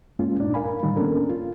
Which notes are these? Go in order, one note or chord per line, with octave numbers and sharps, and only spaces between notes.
G2 G#3 A#3 C#4 F4
D#2 A#2 D4 D#4 D5
A#4 F5 G#5 B5
A2 D3 D#3 G3 D#4
A#3 B3 C#4 D4 A4 A#4
F4